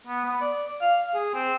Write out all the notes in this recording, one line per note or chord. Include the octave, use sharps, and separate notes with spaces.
B3
B3
D5
F5
G#4
C4